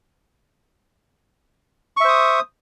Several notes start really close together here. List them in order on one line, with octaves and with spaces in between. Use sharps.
C#6 E5 C5 D#6